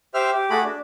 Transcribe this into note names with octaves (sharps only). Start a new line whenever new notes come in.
G4 C5 E5 F6
G4
A3 F#4 G#4 B5 D6
D4